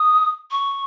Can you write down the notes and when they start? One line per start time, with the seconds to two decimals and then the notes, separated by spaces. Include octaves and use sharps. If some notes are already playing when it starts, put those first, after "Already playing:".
Already playing: D#6
0.51 C#6